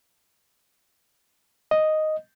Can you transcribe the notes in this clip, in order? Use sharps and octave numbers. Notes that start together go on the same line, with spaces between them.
D#5